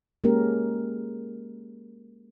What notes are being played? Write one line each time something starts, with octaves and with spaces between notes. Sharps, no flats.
G#3 A#3 C#4 G4 A#4